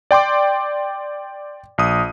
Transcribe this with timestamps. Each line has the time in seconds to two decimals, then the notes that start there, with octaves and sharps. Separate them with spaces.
0.11 D5 G5 C6 D6
1.78 A#1 D#6